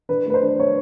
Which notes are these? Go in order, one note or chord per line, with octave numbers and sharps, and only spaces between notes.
D4 B4
A3 B4
C5
D4
D4 C#5